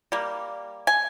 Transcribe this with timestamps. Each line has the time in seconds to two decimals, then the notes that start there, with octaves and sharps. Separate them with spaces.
0.12 G3 A#3
0.87 G#5